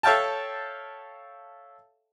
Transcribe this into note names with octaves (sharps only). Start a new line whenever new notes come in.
A4 C#5 E5 F5 G5 A5